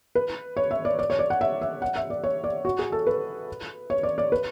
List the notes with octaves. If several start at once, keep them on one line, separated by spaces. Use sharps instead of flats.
B4
C#5
E5
D5
D5
C#5
D5
F#5
E5
E5
F#5
E5
D5
C#5
D5
F#4
G#4
A4
B4
C#5
D5
D5
B4